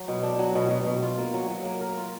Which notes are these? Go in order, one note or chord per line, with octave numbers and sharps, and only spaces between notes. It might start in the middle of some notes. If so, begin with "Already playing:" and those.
Already playing: F#3
B2
D4
F#3
B2
B2
B2
F4
A#3
F#3
F#3
A#3
A#4
F4